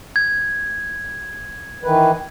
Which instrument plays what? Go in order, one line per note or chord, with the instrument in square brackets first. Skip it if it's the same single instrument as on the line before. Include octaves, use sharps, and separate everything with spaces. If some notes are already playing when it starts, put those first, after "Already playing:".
[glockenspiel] G#6
[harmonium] D#3 E3 B4